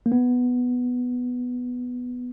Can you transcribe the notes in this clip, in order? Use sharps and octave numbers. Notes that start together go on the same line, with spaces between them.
A#3
B3